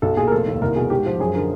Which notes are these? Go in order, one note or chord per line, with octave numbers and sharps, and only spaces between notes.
B1 A4
A#2 G#4
A#4
F1 A4
D#2
C2 A#4
B2 G#4
G#2 G4
F3
F#2 G#4
D3 A#4